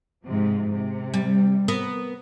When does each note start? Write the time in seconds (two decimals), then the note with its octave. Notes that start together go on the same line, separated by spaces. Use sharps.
0.24 G#2 C3 F3
0.72 C3
1.14 G3
1.68 B3 A#4